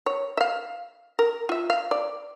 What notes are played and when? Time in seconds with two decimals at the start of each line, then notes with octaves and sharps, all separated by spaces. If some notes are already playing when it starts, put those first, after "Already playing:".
0.06 C#5
0.37 E5 F5
1.19 A#4
1.49 F4 E5
1.70 F5
1.91 D5